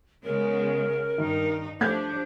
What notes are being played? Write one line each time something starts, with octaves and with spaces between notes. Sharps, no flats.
C#3 G#3 B3 A#4
G2 D#3 D#4
F3 A3 D4 G4 G6 G#6